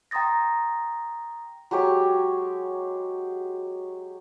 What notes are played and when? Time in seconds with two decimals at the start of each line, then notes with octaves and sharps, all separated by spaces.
0.11 G5 A#5 C6 D#6 A6 A#6
1.71 F#3 G#3 G4 C#5